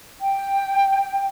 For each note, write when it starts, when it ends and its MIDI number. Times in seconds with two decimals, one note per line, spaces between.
0.21 1.27 79